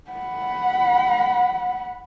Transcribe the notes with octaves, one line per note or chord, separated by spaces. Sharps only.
F#5 B5